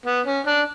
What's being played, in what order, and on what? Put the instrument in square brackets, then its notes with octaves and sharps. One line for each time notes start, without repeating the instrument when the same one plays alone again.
[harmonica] B3
C#4
D4